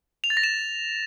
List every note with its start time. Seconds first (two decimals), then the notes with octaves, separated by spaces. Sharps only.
0.24 F7
0.30 A6
0.37 A#6
0.43 E7